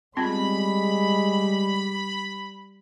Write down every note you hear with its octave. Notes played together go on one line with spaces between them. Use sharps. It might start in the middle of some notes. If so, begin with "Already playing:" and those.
G3 G#3 B3 C4 F4 B5